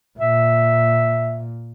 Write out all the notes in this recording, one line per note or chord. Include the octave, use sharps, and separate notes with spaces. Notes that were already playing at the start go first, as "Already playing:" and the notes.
A#2 E5